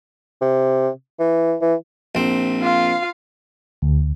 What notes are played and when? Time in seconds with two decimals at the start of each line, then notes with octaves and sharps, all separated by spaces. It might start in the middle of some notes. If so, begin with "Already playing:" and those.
0.42 C3
1.20 E3
1.62 E3
2.15 A#1 C4
2.62 F4 F5
3.82 D2